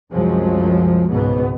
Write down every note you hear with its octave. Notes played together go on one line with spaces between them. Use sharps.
C2 F#2 F3 F#3 G#3
C#2 G#2 B2 B3